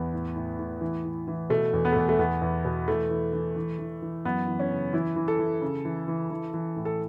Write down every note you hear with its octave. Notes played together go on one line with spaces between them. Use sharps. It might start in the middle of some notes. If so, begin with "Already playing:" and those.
Already playing: E2 B3
A2
A2
A2
E3
A2
E3
B2 A3
E2
B3
A3
E2
A3
E2 B3
E2
B2
E3 A3
E3
E3
E3
E3
E3
F#2 B3
E3
C#4
C#3
E3 E4
E3
A4
E3
C#3
E3
E3
E3
E3
A2
A4